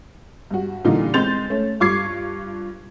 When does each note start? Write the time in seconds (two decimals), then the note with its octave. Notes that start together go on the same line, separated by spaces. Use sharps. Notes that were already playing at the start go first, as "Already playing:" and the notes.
0.51 G2 F#4
0.84 A#2 D3 E3 G3 D#4 F4
1.14 G#3 C4 C6 G6 A6 F7
1.50 A3 C#4
1.80 G2 F4 C#6 D6 G#6 C7